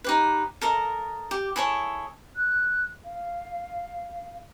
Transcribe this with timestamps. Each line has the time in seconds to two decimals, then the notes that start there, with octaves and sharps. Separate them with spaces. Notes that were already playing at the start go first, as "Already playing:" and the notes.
0.04 D#4 G4 B4
0.61 A4 A#4 D#5
1.31 G4
1.56 E4 G#4 A4 C#5
2.36 F#6
3.04 F5